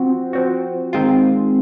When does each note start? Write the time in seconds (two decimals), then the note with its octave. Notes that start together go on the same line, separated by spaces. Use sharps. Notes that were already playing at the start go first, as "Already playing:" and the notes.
Already playing: F3 C4 F#4
0.33 F3 C4 F#4
0.93 D#3 G#3 C4 F4